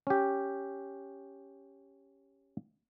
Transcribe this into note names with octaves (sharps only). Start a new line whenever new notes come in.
C#4 G4